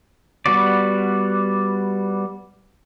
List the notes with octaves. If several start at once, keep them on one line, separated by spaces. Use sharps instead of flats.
G3 B3 F#4 D5